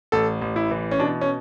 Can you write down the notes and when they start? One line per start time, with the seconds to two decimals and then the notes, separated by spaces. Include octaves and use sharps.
0.12 A1 A4
0.42 A1
0.56 E4
0.71 E3
0.91 C#4
1.00 B2 D4
1.21 C#4